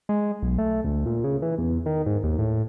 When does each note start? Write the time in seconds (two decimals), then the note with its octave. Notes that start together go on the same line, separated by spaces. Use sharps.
0.09 G#3
0.42 B1
0.58 A3
0.85 D2
1.06 A#2
1.24 C#3
1.42 E3
1.58 E2
1.86 D#3
2.06 G#2
2.24 D#2
2.39 A2